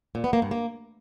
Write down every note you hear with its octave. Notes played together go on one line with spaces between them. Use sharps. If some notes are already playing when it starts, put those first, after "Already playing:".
A#2
B3
A#3
G2
A#3